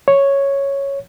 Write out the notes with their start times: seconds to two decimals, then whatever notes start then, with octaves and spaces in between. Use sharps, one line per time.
0.08 C#5